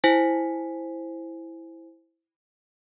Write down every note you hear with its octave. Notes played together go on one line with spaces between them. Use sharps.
E4 C5 G#5 B6